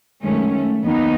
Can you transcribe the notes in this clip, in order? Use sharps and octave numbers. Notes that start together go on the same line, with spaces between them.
F#2 D#3 G#3 A3 C#4
A3
D#2 D#3 B3 D#4